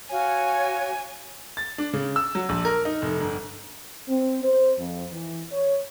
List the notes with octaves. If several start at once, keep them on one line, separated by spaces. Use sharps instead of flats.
F#4 C#5 F5 G#5
A6
D4
C#3
E6
F#3
A#1
A#4
D#4
F1
G1
C4
C5
F2
E3
C#5